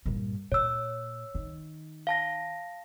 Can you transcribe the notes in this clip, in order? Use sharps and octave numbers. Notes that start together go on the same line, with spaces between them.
G2 A#2
A#2 C#5 E6
D#3
F5 A5 A#6